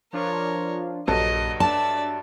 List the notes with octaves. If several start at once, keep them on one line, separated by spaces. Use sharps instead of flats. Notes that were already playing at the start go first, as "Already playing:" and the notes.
F3 D4 F4 A#4 C#5
A#1 G2 F#3 A4 D#5
D4 D5 E5 A5 A6